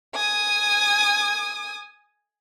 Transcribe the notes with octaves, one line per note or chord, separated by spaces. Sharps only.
G#5 D#6